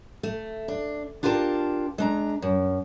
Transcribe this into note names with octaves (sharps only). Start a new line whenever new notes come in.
A3
D4
D4 F4 G4 A#4 G#5 A5
G#3 D4 A#5
F#2